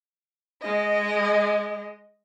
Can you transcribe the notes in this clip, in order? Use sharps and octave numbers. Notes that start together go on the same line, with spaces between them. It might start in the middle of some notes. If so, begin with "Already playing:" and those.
G#3 D#5